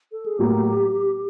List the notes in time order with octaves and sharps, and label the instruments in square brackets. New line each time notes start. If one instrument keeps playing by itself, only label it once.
[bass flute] A4
G#4
[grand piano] A2 F#3 A#3 [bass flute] G4